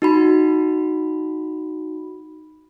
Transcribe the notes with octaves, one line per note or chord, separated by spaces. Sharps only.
D#4 F#4 B5